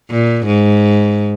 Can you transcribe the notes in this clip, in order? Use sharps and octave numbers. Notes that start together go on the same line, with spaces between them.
A#2
G#2